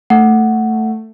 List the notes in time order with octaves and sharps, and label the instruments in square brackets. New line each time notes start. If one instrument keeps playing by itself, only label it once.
[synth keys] A3 [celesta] F#5